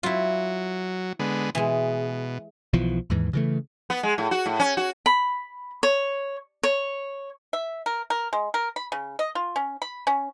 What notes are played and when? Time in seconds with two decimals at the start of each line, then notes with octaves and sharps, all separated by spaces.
0.03 F#3 E4 F4
1.19 D3 G#3 B3
1.55 B2 E3 G#3
2.73 B1 B2 E3 F3
3.10 D#2 G#2 E3
3.33 C#3 E3 A3
3.90 B3
4.03 G#3
4.18 A2
4.31 F#4
4.46 A2
4.59 C#4
4.77 F#4
5.06 B5
5.83 C#5
6.63 C#5
7.53 E5
7.86 A#4
8.10 A#4
8.33 G#3
8.54 A#4
8.76 B5
8.92 C#3
9.19 D#5
9.35 F4
9.56 C#4
9.82 B5
10.07 C#4